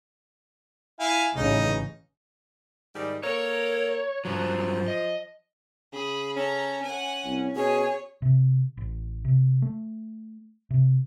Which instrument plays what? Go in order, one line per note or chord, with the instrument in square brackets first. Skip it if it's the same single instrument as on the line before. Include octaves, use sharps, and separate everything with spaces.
[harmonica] E4 F5 G#5
[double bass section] A1 C#3 [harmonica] D#4
[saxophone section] G#2 D#3 G3
[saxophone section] A#3 A4 A#4 [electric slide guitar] C#5
[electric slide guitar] G2 F#3 [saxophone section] F3
[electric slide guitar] D#5
[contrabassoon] C#3 [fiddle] G#4 B5
[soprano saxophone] C#4 [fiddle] A4 A#5
[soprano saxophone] C#4 [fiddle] F#5 G#5
[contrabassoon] C2
[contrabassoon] B2 [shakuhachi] G#4 [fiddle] C#5
[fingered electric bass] C3
A1
C3
A3
C3